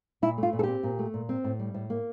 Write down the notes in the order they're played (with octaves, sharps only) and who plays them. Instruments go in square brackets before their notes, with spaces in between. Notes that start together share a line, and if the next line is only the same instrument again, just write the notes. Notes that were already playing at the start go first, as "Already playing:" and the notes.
[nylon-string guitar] A#2 E4
A3
F4
A#2
A4
C4 G4
A#2
A3
A#2
C4
A2
G3
A2
A#3